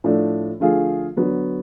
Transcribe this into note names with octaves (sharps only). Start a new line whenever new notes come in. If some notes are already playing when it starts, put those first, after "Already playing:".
A2 F3 A3 D4
D3 F3 A3 F4 G#4
D3 F#3 B3